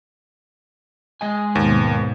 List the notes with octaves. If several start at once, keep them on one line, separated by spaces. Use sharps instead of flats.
G#3 D#5 G#5
D#2 G#2 B2